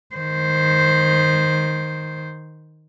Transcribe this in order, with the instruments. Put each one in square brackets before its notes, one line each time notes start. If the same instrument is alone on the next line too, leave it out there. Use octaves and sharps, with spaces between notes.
[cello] D#3 C5